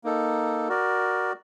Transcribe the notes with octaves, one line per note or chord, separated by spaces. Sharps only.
A#3 D#4 A4
F#4 A#4 D5